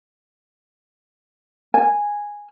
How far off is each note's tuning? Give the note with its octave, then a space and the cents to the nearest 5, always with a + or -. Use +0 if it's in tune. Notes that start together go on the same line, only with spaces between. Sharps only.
G#5 -10